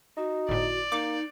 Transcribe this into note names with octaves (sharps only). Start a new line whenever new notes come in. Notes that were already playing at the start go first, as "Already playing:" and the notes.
D#4 F#4
G1 A2 D5
A#3 D#4 D6